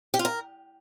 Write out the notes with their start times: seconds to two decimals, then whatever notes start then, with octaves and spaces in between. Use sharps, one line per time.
0.14 G4
0.19 F4
0.25 A#4